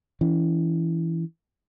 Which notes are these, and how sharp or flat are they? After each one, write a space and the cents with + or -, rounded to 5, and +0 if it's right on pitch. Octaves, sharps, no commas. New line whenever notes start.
E3 +0 C#4 +35